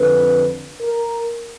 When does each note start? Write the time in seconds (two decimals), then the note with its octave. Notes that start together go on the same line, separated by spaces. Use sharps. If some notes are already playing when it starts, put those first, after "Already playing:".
Already playing: F2 D3 B4
0.81 A#4